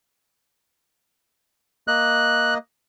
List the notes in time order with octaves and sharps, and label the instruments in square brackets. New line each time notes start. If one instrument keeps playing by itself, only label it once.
[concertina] A#3 D#5 [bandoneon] F#6